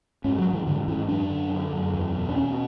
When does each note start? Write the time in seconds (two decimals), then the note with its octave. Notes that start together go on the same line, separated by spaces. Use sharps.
0.24 G#2 C#4
0.39 F#3
0.45 G#2
0.53 E3
0.66 G#2 D3
0.88 G#2 E3
1.09 F#2 D4
1.30 D3
1.52 D3
1.73 F#2
1.93 E2
2.15 B2
2.29 D4
2.36 B2 C#4